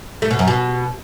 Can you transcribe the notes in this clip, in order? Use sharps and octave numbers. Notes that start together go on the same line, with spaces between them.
A3
B2
F#2
B2